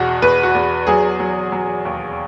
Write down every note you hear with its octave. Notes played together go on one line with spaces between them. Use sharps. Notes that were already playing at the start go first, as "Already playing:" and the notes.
Already playing: E2 B2 F#4
E2 B4
F#4
E2
F#3 G#4
F#3
F#3
D#2